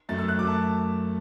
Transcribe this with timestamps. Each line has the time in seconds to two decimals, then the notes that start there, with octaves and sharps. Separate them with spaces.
0.09 F#2 F#3 A3 A6
0.18 E6
0.28 F#6
0.39 F#2 F#3 A3 D6
0.47 A5